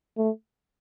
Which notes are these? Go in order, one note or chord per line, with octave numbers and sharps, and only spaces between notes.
A3